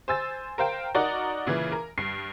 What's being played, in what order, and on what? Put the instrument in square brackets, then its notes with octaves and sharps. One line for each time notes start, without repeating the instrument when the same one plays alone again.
[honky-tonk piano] C5 G#5 E6 A6
A#4 C5 F5 G5
D#4 F#4 A#4 D5 F#5
A#2 C#3 E3
A#4
G2 C7